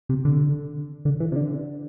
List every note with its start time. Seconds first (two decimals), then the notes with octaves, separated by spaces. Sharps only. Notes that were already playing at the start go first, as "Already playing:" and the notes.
0.09 C3
0.25 D3
1.05 D3
1.20 E3
1.32 C3
1.36 D3